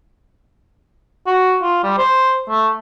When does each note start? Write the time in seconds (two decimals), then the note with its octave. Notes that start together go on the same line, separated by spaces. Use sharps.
1.27 F#4
1.62 F4
1.83 G3
1.98 C5
2.49 A3